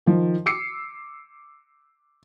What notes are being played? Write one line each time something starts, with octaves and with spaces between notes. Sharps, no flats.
D#3 F3
D6 E6 C7 C#7